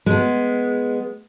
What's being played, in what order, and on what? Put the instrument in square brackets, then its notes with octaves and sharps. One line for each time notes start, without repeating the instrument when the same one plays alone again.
[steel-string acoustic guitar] G#3 B3